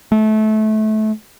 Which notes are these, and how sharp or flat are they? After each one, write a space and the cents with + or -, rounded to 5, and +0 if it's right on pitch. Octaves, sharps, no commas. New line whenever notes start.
A3 -25